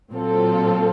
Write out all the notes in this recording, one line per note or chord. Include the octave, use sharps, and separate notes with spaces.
A#2 F#3 C4 F4 A4